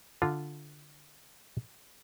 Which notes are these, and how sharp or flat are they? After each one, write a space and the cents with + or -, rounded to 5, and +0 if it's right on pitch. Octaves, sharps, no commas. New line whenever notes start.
D3 +0 F4 +0